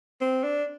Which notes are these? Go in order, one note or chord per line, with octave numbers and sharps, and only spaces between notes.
C4
D4